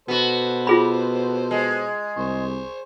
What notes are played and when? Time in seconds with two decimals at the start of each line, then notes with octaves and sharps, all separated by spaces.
0.08 B2 B3 F#4 A4 C5
0.67 F4 G#4 B5
1.51 G#3
2.17 C2 C5 C#6